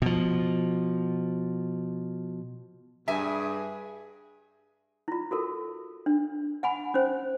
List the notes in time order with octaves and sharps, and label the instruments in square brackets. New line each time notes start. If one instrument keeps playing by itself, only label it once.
[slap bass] B2 F3
[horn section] G2 G#4 [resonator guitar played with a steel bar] E5 G#5
[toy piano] E4 F4
F#4 A4 A#4
D4
F#5 G#5 B5
C#4 C5